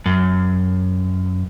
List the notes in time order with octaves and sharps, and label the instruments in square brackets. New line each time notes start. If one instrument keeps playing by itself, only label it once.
[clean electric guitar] F#2